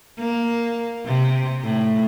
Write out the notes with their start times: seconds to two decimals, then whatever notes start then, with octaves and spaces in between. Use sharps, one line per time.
0.19 A#3
1.05 C3
1.64 A2